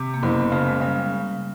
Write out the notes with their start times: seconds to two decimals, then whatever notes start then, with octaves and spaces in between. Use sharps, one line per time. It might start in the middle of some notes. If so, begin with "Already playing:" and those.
Already playing: C3
0.14 A#3
0.23 F#1 B3
0.52 C#3 A3
0.67 G#3
0.81 C#3 G3